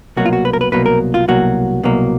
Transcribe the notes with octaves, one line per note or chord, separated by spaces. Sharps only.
C2 B2 F#3 A#3 F#4
F4
F#4
B4
A#4
B4
C2 B2 F#3 A#3 B4
A#4
F4
C2 B2 F#3 A#3 F#4
C2 B2 F#3 A#3